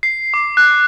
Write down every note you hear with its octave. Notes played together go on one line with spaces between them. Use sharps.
C7
D6
F#6